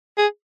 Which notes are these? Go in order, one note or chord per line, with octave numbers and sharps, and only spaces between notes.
G#4